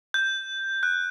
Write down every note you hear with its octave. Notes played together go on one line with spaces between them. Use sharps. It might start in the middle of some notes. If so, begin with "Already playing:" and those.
G6
F#6